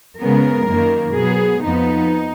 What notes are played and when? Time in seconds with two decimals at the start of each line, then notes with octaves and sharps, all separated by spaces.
0.19 C#3 G#3 B3 A#4
0.68 F#2 D#3 A#3
1.15 B2 F#3 B3 G#4
1.62 F2 F3 B3 D#4